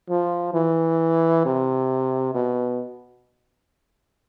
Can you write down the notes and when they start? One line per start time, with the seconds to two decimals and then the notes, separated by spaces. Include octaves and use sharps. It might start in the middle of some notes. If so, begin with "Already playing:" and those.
0.10 F3
0.54 E3
1.45 C3
2.34 B2